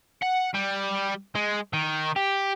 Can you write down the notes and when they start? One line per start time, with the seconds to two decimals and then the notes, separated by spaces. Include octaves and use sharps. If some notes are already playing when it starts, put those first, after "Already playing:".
0.23 F#5
0.55 G3
1.35 G#3
1.73 D#3
2.16 G4